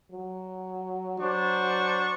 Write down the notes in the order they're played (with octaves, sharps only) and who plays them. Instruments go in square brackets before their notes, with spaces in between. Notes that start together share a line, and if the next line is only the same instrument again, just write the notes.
[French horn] F#3
[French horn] F#3 [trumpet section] D4 C5 C#6